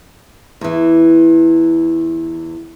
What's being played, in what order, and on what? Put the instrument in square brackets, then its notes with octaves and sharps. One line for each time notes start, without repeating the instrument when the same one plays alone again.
[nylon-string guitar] E2 E3